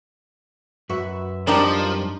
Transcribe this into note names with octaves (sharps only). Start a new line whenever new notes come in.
F#2 F#4 B4 E5
F3 G3 C4 D4 D#4 G4 A#4